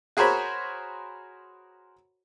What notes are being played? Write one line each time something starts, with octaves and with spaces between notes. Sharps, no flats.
F#4 G#4 A#4 C5 C#5 B5